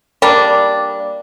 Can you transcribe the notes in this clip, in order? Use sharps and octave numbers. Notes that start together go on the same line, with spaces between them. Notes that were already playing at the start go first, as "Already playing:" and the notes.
G3 A#3 D4